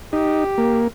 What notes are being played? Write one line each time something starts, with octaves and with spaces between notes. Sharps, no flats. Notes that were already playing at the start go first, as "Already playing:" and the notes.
D#4 G4
A#3